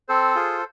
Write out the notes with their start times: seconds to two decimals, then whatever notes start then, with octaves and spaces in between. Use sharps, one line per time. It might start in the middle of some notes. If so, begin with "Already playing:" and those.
0.09 C4 A4 C5
0.36 F4 G#4